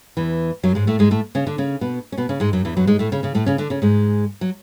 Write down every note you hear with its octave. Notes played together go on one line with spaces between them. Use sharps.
E2 E3
F#2 F#3
G#2 G#3
A2 A3
G#2 G#3
A2 A3
C#3 C#4
D3 D4
C#3 C#4
B2 B3
C#4
B2 B3
C#3 C#4
G#2 G#3
F#2 F#3
E2 E3
F#2 F#3
G#2 G#3
A2 A3
C#3 C#4
C#3 C#4
A2 A3
C#3 C#4
D3 D4
C#3 C#4
G#2 G#3
F#3